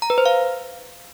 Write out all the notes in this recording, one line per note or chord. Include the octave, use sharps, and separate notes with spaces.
A#5
B4
C5
F5